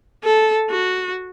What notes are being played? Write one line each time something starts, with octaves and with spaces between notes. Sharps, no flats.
A4
F#4